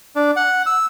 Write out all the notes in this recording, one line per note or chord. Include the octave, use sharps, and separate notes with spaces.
D4
F#5
E6